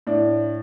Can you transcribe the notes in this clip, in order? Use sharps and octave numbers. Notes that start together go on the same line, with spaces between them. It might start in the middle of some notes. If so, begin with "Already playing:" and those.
A2 D4